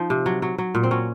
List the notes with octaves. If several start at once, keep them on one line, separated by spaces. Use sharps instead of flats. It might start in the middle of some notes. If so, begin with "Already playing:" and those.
Already playing: F3 D#4
C3
F#3
F#3
F#3
A#2
C4
F#3 C#4